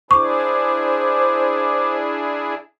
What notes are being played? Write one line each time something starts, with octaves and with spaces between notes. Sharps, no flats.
D4 E4 G#4 C5 C#6 D6